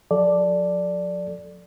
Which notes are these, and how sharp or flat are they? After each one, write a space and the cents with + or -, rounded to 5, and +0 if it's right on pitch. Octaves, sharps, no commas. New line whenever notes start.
F3 +45 A4 +0 D5 +0